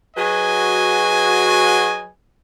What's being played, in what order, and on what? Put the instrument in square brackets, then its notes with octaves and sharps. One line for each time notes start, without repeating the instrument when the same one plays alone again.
[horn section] F#3 F#4 G#4 B4 D#5 G#5